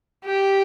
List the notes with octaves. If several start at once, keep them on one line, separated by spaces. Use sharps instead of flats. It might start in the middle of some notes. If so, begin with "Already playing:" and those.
G4